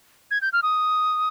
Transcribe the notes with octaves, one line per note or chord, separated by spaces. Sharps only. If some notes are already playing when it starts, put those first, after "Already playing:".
G#6
G6
F6
D#6